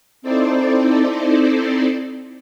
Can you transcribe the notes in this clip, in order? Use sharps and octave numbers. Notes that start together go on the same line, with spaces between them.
C4 D#4 E4 A4 C5 D5